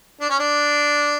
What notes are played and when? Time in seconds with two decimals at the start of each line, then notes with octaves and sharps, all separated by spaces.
0.21 D4
0.30 C#4
0.39 D4